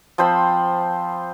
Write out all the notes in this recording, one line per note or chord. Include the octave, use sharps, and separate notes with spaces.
F3 C4 C5 B5